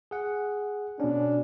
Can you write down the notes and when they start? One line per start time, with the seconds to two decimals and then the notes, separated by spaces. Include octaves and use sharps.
0.11 G#4 F#5
1.00 B2 C#4 D4